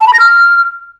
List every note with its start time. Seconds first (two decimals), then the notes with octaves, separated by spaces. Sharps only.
0.01 A5
0.07 B5
0.13 A#6
0.19 F6